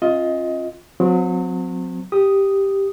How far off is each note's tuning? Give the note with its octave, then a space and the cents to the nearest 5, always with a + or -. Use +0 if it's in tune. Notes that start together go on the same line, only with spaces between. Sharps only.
C#4 -45 F4 +5 D#5 +20
F#3 -35 C4 -20
G4 +0 D#6 +0